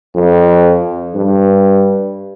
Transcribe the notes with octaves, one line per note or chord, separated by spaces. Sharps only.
F2
G2